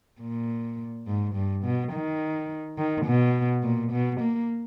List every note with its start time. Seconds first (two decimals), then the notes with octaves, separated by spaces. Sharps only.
0.21 A#2
1.07 G#2
1.35 G2
1.64 B2
1.92 D#3
2.78 D#3
3.06 B2
3.64 A#2
3.92 B2
4.21 A#3